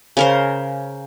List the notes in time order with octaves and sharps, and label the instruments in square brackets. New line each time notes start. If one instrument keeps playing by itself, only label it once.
[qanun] C#3 A#4 C5